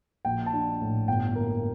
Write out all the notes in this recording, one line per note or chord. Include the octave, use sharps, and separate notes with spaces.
A#1 G5
A5
D4
A2
G1 G5
A#3